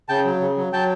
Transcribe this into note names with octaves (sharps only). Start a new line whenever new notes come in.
C#3 G5 A5
F#3
C#3
F#3
F#3 G5 A5